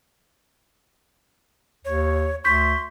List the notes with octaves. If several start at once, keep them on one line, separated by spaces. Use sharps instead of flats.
D#2 C#5
D2 C6 C#6 G6 B6